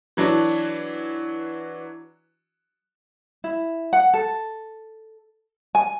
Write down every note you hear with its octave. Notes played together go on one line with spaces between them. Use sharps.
E3 F#3 D4 F#4
E4
F#5
A4
G#5